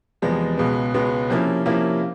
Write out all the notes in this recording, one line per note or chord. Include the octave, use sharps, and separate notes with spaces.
E2 C3 F3 G#3 B3
C#2 B2 G#3 B3
C#2 B2 G#3 B3
C3 F3 A#3 C#4 E4
C3 F3 A#3 C#4 E4